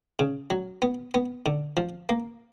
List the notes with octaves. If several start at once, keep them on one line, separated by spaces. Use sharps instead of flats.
C#3
F#3
B3
B3
D3
F3
A#3